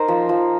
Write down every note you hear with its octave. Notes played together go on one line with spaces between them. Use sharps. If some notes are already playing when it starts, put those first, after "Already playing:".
Already playing: D#4 A#4 C5
F3
F3